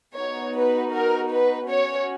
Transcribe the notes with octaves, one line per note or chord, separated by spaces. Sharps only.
B3 D#4 F#4 C#5
B4
A#4
B4
C#4 F#4 C#5